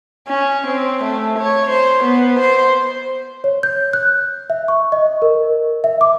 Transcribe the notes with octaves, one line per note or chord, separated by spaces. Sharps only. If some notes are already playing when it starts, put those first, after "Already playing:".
C#4
C4
A3
C#5
C5
B3
C5
C#5
G6
F#6
E5
C#6
D#5
A#4
E5
D6